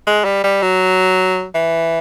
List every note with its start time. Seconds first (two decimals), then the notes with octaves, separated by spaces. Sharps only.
0.07 G#3
0.25 G3
0.44 G3
0.62 F#3
1.55 E3